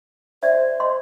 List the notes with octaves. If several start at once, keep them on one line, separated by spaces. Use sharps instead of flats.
C5 D5 E5
D#5 C6